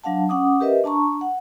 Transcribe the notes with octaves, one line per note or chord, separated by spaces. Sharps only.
F#3 D4 F5 F#5 A5
C#4 F#5 D6 D#6
G4 A#4 B4 D#5 E5
D4 A5 A#5 C#6
F#5